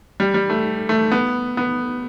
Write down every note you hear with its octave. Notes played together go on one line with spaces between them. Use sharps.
G3
G3
A3
A3
B3
B3